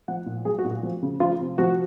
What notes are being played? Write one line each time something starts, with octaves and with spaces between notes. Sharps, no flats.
F3 F#5
A#2
F#3 G#4
F#4
A#2
F#4
F3
C#3
F3 F4
C3
F3 F#4